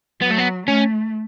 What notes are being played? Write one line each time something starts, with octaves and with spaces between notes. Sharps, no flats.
F#3 B3
A3
B3
A3 C#4